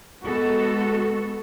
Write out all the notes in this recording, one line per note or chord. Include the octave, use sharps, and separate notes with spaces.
G#3 B3 F#4 A4